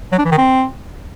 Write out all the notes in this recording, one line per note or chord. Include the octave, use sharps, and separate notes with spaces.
F#3
D4
E3
D#3
C4